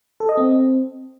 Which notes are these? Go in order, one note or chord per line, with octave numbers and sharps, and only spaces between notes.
A4
D#5
C4